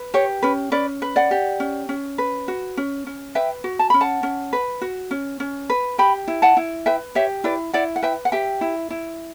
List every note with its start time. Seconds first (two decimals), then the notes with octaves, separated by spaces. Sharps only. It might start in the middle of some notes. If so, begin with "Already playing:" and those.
Already playing: B4
0.14 G4 C#5
0.43 C#4 B4
0.72 C#4 B4 D5
1.02 B4
1.16 D5 F#5
1.31 G4
1.60 C#4
1.89 C#4
2.18 B4
2.48 F#4
2.77 C#4
3.07 C#4
3.35 B4 E5 G5
3.64 F#4
3.79 A5
3.90 C#4 B5
4.01 F#5 A5
4.23 C#4
4.53 B4
4.82 F#4
5.11 C#4
5.40 C#4
5.70 B4
5.98 G4 G5 B5
6.28 E4
6.42 F#5 A5
6.57 E4
6.86 B4 E5 G5
7.15 G4 C#5 E5
7.44 E4 B4 D5
7.73 E4 D5 F#5
7.96 F#5
8.03 B4 E5 G5
8.25 F#5
8.32 G4 E5 G5
8.61 E4
8.90 E4